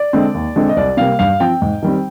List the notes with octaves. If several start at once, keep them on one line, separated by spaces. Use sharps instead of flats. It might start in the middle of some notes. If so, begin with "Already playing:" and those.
Already playing: D5
D3 G#3 C4
D#2
D3 G#3 C4
D#5
C2 D5
C3 G3 A#3 F5
G2 F5
F3 C4 G5
G#2
D#3 G3 C4